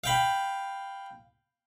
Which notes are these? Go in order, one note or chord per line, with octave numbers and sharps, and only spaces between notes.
F5 G5 B5